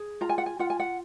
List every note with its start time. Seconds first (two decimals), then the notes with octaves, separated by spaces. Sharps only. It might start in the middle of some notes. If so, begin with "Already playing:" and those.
Already playing: G#4
0.21 F4 A#5
0.29 G#5
0.38 F#5
0.46 G#5
0.59 F4 F#5
0.70 G#5
0.80 F#5